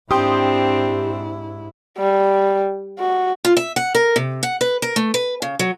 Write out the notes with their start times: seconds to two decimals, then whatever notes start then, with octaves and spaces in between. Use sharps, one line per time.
0.11 G#2 C4 D4 E4 G4 G5 C6 D#6
1.98 G3
2.99 F#4
3.45 F4
3.57 E5
3.76 F#5
3.95 A#4
4.16 C3
4.43 F#5
4.61 B4
4.82 A#4
4.96 A3
5.14 B4
5.42 C#3
5.59 F#3